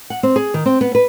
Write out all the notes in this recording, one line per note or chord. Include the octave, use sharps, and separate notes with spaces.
F#5
C4
G#4
D#3
C4
B3
B4